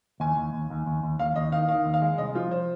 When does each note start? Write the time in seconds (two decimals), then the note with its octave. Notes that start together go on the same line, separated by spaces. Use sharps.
0.20 D#2 G#5
0.37 D#2
0.53 D#2
0.70 D#2
0.86 D#2
1.03 D#2
1.19 D#2 F5
1.36 D#2 D#5
1.52 D#3 F5
1.68 D#3 F5
1.86 D#2
1.94 F5
2.02 G#3
2.18 C2 D#5
2.35 F3 F4
2.51 C5